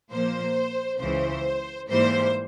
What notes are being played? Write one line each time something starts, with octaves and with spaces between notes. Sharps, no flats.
A#2 F3 A#3 C5
C#2 C#3 E3 C5
G#2 E3 G3 A#3 C5